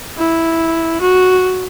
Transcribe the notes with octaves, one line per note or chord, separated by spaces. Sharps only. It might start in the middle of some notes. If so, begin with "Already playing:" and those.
E4
F#4